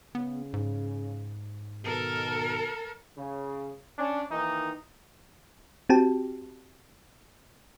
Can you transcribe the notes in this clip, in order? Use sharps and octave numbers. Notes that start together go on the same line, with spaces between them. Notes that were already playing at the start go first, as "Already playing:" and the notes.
C#3 B3
G#2
B2 D#3 A4 A#4
C#3
C#4 D4
D#3 E3 A#3 D#4
C4 F#4 G4 G5 A5